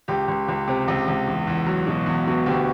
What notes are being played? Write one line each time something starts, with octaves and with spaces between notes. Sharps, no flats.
C#2 G4
C#2
C#2
C3
C#2
C#2
E2
E2
F#3
B2
E2
B2
D2 G4